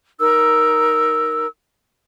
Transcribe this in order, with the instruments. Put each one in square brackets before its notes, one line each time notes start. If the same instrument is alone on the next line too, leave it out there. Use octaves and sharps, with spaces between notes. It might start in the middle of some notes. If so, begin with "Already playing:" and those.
[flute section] D#4 A#4 E6